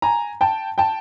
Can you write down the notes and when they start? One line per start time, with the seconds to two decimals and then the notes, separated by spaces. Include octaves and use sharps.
0.02 G#5 A#5
0.41 G5 A5
0.78 G5 A5